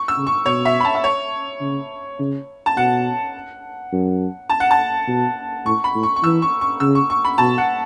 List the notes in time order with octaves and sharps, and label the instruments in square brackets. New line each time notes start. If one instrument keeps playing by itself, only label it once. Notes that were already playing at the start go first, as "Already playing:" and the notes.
Already playing: [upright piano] C#6
E6
[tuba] C#3
[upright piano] C#6
[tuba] B2 [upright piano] C#5
[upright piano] E5
B5
A5
E5
C#5
[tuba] C#3
C#3
[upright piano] A5
[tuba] B2 [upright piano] F#5
[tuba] F#2
[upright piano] A5
F#5
A5
[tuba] B2
[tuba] A2 [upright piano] C#6
[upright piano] B5
[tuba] A2
[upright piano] C#6
C#6
[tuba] E3 [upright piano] E6
[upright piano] C#6
C#6
[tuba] C#3 [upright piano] E6
[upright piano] C#6
C#6
B5
[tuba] B2 [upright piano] A5
[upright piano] F#5